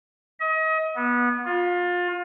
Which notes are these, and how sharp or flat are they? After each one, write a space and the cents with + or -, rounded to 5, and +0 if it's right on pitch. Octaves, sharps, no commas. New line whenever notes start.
D#5 +35
B3 -20
F4 +25